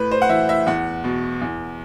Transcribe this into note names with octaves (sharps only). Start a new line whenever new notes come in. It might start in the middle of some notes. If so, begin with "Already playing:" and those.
Already playing: A2 B4
C5
F#5
E3 E5
E5
E2 F#5
B2
E2